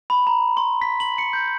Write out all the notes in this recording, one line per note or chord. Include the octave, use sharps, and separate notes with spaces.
B5
A#5
C6
B6
F#7
C#7
G6